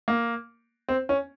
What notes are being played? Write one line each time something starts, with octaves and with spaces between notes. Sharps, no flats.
A#3
C4
C#4